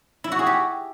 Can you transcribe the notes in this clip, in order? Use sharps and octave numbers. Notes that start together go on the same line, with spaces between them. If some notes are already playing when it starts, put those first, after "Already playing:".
E4
F#4
G#4
G4